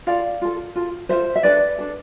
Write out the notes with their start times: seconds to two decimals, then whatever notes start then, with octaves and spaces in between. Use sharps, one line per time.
0.07 F4 A4 D5 F5
0.42 F4 A4
0.76 F4 A4
1.09 F4 A4 C5 E5
1.36 E5
1.43 D4 A4 B4 D5
1.78 D4 A4